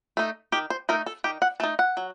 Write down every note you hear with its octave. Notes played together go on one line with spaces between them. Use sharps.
A3 D#4
D#3 G4
C5
A3 D#4 A#4
A4
D#3 G4
F#5
A3 D#4 A5
F#5
F#3